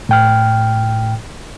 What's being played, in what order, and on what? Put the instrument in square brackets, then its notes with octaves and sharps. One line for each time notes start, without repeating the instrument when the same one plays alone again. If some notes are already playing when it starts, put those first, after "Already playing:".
[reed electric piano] A2 G5 F6